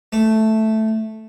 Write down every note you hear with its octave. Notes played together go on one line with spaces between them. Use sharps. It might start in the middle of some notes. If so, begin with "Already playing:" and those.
A3